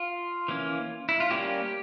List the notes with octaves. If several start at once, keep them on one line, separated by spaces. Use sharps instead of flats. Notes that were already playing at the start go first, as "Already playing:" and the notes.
Already playing: F4
E3 A#3 C#4
E4
F4
G3 A#3 C#4 G4